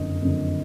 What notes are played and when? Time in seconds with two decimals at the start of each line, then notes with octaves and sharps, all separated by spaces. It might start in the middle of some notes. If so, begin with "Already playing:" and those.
Already playing: F#1 F2 D3 D#5
0.22 F#1 F2 D3